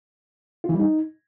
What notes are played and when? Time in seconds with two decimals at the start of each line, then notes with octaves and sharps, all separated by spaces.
0.64 F4
0.69 E3
0.74 G3
0.79 D#4